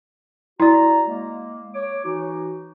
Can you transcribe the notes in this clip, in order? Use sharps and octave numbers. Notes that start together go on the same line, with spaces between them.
E4 F#4 D5 A#5
G#3 A#3
C#5 D6
E3 D#4 F#4